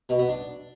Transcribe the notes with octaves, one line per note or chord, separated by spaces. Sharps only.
B2
B3
D4